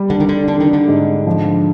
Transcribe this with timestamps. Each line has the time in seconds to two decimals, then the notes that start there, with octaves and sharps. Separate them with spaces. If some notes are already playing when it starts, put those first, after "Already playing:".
Already playing: G3
0.09 D3 D4
0.20 D#3
0.29 D3
0.48 D3 D4
0.60 D#3
0.73 D3
0.88 G#2
1.27 F3